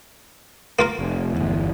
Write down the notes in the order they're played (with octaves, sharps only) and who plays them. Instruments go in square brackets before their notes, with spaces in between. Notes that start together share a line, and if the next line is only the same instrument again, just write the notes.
[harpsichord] A#3 F4 A#4
[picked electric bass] F1
G1 E2